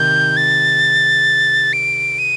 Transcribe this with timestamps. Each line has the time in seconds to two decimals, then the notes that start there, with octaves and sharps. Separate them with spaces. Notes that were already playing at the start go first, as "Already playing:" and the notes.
Already playing: C3 D#3 G6
0.37 A6
1.73 D7
2.19 D#7